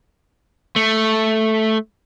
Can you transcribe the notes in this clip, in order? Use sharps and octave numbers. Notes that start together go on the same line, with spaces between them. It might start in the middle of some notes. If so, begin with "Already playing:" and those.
A3